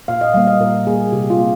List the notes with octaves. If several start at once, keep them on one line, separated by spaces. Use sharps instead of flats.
A#2 F5
D#5
G3 A#3 F5
D#5
A#2 A#4
G3 A#3 G#4
C3 G4
F4
A#3